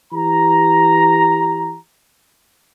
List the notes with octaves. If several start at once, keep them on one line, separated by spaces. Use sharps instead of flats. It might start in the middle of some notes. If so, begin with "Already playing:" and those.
E3 G4 A#5